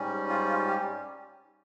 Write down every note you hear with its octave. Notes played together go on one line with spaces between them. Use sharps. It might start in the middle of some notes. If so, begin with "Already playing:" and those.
Already playing: G#2 G3 C#4
F4
F4
G4